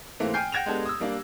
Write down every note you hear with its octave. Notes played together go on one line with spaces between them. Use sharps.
G#2 E3 A3 A#3 C4
G5 G#5 F6 G6 C7
F#5 G5 G#6 A#6 E7 F7
G#3 B3 D4 G4 A4
D#6 E6
G3 A#3 D4